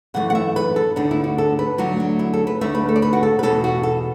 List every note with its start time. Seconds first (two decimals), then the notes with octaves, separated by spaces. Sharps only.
0.14 F#2 E3 A3 F#5
0.30 F#5
0.35 E5
0.56 B4
0.76 A4
0.96 D2 D3 B3 D4
1.11 E4
1.24 F#4
1.38 A4
1.59 B4
1.78 D2 D3 F#3 A3 F#4
2.00 D4
2.19 E4
2.34 A4
2.47 B4
2.61 D2 D3 A3 E5
2.75 B4
2.89 A4
2.96 D5
3.02 B4
3.13 F#4
3.23 A4
3.39 B4
3.43 E2 B2 B3 A4
3.64 F#4
3.83 A4